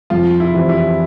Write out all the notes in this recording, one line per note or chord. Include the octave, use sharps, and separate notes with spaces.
F2 F4
E4
E3 G3 C4
E4